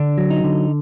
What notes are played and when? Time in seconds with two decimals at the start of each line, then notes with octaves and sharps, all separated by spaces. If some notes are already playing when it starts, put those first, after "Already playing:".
Already playing: D3 D4
0.18 F#3
0.30 D#4
0.44 D3